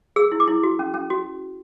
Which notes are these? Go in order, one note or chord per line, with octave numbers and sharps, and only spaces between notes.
G#4 E6
E4
D6
E4
F#4
C#4
C#4
F#4